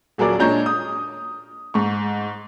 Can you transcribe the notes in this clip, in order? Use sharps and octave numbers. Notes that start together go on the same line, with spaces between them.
D#1 F#3 G#4 A#4 D5
A#2 G#3 D4 C#5 A#5 G6
D#6
G#2 C#6